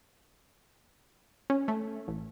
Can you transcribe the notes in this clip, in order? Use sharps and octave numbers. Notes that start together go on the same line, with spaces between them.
C#4
A3
A1